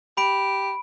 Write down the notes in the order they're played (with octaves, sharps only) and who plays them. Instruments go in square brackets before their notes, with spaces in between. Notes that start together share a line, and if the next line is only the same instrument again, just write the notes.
[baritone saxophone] G4 [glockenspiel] B5 D7